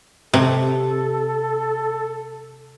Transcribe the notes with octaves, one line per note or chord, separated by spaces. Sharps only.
C3 A4